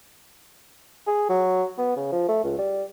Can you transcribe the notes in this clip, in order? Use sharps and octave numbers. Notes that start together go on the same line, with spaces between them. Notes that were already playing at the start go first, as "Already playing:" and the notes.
G#4
F#3
B3
C#3
F3
A3
C#2
G3